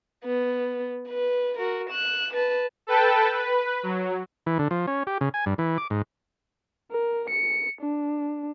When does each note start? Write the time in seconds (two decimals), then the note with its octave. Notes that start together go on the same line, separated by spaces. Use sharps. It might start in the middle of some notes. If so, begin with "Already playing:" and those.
0.24 B3
1.09 B4
1.58 F#4 A#4
1.90 F#6 E7
2.34 B4 A5
2.87 A4 B4 G5 A5
3.34 B4
3.83 F#3
4.46 E3
4.59 D3
4.71 F3
4.87 C#4
5.07 G4
5.21 C#3
5.34 G#5
5.46 G2
5.58 E3
5.78 D6
5.90 G#2
6.91 A#4
7.30 C#7
7.81 D4